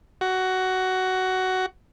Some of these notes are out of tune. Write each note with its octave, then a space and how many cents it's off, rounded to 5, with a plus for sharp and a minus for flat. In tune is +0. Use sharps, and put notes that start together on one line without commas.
F#4 +15